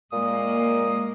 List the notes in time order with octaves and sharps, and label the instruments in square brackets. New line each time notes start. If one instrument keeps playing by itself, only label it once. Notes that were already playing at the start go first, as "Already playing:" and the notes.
[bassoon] A#2 [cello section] G#3 A#3 [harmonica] D#6